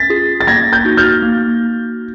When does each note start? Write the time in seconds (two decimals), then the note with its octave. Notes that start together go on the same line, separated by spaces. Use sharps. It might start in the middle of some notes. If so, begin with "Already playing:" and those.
Already playing: C#4 A6 B6
0.10 F4 G#4
0.40 A6
0.47 A#3 G#6 A#6
0.73 G6 A6
0.85 D#4 F#4
0.97 F6 G6
1.22 A#3